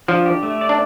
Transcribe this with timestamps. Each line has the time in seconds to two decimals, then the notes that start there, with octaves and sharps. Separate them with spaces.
0.08 F3 D4
0.26 G4
0.43 A3
0.61 D5
0.69 D4